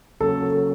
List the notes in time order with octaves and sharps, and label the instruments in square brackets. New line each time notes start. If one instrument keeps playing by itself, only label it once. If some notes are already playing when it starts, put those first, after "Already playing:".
[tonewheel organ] C#3 F#3 A#3 C#4 [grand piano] A4